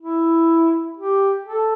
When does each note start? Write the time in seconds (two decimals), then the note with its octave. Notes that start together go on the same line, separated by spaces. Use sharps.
0.01 E4
0.97 G4
1.44 A4